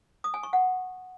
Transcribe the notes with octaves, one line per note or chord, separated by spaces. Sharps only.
D#6
G#5
C#6
F#5